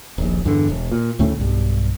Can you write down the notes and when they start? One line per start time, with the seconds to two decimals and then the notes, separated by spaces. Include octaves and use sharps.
0.18 D#1 A#1
0.44 E2 G2 D3
0.68 E1
0.91 A#2
1.19 D2 A2 C#3 A3
1.39 B1 G2